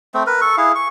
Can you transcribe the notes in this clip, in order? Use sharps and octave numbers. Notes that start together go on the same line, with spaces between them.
A3 C4
A#4 B4
A4 C#6
E4 G#4 F5
C#6